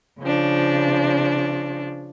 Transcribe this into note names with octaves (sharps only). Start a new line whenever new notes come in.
C#3 F3 D4